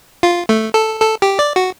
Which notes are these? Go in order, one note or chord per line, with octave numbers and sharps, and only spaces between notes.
F4
A3
A4
A4
G4
D5
F#4